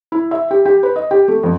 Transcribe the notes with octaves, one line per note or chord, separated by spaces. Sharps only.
E4
E5
G4
G4
B4
D#5
G4
A3
F2